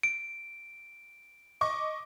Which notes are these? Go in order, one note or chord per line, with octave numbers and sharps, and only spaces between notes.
D7
D#5 C#6 D6